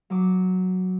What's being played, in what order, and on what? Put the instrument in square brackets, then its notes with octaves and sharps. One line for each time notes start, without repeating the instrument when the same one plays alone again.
[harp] F#3 D6